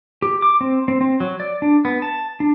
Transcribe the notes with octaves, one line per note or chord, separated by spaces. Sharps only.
G4
D6
C4
C4
C4
F#3
D5
D4
B3
A5
D4